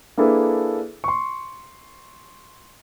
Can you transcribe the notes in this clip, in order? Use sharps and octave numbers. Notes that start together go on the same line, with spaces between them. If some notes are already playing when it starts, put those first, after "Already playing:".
A#3 D4 E4 G#4 A4 B4
C6 C#6